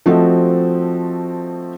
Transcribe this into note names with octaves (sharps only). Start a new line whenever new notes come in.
F3 A3 C4 F#4 A4 D#5